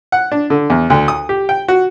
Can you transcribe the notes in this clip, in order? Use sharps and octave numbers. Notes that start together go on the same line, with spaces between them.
F#5
D4
D3
E2
D2
D#6
G4
G5
F#4